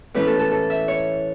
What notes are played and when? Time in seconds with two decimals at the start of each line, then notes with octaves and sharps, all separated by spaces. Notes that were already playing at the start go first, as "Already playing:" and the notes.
0.14 A2 E3 A3 C#4 B4
0.27 A4
0.39 A4
0.52 A4
0.70 E5
0.88 C#5